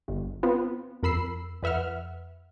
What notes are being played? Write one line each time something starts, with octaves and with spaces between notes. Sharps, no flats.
G1
B3 C4 F4
F2 A#4 B5 E6 C7
F2 B4 E5 F#5 F6